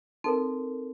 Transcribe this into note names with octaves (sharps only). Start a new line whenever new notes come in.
C4 D#4 A4 A#4